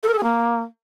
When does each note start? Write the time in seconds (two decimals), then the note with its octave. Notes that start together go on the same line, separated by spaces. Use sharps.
0.03 A4
0.08 A#4
0.13 A4
0.18 G#4
0.23 A#3